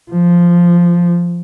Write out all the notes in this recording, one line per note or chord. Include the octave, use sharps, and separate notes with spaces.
F3